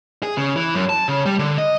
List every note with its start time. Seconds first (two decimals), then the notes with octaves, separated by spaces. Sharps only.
0.23 G#4
0.37 C#3
0.56 E3
0.75 F#2
0.89 A5
1.08 C#3
1.26 G3
1.39 D3
1.58 D#5